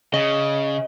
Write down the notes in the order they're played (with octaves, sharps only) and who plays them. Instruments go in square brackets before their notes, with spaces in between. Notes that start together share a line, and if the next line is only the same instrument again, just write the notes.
[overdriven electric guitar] C#3 [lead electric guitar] D#5